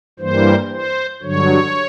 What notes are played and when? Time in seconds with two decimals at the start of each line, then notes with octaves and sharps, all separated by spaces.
0.19 G2 E3 G3 A#3 C5
0.70 C5
1.22 G2 D3 F#3 C#5